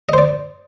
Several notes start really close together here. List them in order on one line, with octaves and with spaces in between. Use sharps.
D#5 C5 D5